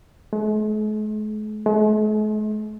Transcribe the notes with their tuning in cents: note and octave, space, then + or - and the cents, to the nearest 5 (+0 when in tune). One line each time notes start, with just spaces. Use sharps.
G#3 +45
G#3 +45